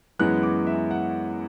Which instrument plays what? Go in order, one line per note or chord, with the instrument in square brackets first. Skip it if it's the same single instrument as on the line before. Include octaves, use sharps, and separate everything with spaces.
[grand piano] F#2 E3 G#3 B3 F#6
D6
E5
F#5